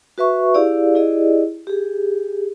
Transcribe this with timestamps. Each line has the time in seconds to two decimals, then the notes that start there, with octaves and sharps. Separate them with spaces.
0.18 F#4 B4 E5 C#6
0.54 E4 G4 G#4 D5 F5
0.95 E4 G4 G#4 D5 D#5
1.67 G4 G#4